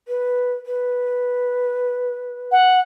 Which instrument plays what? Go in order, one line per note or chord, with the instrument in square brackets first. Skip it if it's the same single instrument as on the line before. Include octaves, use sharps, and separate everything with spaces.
[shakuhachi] B4
B4
[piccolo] F#5